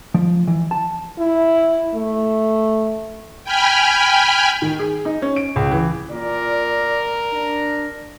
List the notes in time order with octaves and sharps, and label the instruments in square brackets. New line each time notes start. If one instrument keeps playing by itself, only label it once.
[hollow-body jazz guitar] F3
E3
A5
[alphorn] E4
A3
[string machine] G5 G#5 B5 F6
[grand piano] D#3
G#4
D#4
C#4
D7
C#2
E3
[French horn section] A#2 D5 [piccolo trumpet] A#4
[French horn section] D4